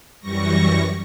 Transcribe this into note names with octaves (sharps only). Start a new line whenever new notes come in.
F#2 E3 G3 C#6 A#6